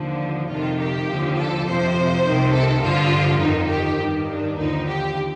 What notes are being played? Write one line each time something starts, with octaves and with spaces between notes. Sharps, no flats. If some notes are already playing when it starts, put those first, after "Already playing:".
Already playing: D#2 D3 F3 D4
F2 C3 D#3 F4
G4
D#2 D3 F3
A4
F2 C3 F3 C5
C2 C3 D#3
A4
G2 D3 F3 F4
F2 D#3 D#4
G4
G2 D#3
D4
D#2 D3 F3 D#4
G4